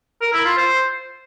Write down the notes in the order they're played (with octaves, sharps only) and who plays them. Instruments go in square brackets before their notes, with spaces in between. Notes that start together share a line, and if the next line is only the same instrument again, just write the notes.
[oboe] A#4
E4
F4
C5